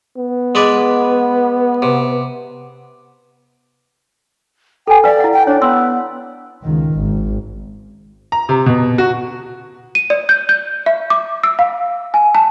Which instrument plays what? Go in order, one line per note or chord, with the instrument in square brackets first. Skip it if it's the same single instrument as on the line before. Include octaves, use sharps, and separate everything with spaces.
[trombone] B3
[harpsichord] G#3 B4 D5
C3
[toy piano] A4 G#5 [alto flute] G5
[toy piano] B4 F5 [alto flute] D5
[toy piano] E4 F#5
[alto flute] G5
[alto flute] D4 [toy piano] C#5
[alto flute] B3 [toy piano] C6 E6
[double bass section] C#2 D#3
G#1
[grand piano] A#5
C3
B2
F#4
[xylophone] D#7
D5
G6
G6
E5
D6
E6
F5
G#5
A5